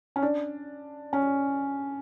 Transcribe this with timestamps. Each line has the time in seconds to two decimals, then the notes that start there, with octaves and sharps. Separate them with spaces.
0.16 C#4
0.22 D4
1.13 C#4